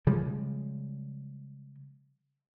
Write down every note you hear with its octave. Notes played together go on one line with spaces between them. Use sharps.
C#3 F3 G3 G#3